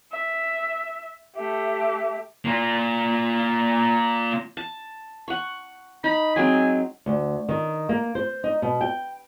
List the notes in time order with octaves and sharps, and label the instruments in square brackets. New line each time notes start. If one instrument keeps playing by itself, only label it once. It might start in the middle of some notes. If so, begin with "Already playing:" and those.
[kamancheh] E5
[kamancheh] A3 G4 [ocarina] E5
[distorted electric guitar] A#3 F4
[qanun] A5
F#5 C#6
[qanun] D#4 [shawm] B5
[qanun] F#3 G#3 C4 [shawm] G#5
[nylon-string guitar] D2
D#3
A#3
C5
D#4
B2
G5